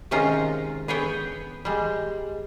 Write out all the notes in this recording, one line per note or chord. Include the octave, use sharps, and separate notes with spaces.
C3 D#3 G#3 C#4 F4 A#5
B3 G#4 C#5 G5
G3 G#3